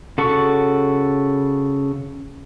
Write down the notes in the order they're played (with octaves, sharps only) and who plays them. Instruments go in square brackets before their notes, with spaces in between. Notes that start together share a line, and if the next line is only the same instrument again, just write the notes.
[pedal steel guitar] C#3 F#4 A4 C#6